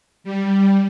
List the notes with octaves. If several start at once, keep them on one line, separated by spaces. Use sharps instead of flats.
G3